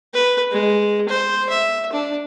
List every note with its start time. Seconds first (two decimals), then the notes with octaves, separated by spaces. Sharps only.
0.14 B4
0.51 G#3
1.08 C5
1.49 E5
1.92 D4